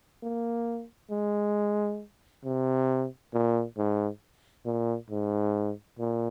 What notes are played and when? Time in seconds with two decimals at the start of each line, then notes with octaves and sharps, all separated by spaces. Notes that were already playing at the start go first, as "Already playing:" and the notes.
0.23 A#3
1.10 G#3
2.44 C3
3.33 A#2
3.77 G#2
4.65 A#2
5.10 G#2
5.99 A#2